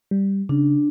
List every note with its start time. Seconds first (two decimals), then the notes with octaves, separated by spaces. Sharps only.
0.11 G3
0.49 C#3 D4